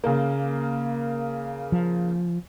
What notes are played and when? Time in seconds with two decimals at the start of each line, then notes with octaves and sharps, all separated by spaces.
0.04 C#3 A#3
1.72 F3